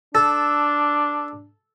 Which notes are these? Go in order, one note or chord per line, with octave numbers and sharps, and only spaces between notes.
D4 A4